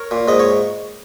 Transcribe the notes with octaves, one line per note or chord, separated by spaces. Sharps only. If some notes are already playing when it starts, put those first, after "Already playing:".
Already playing: A#4 C#5
A#2
G#2 D#5
C#5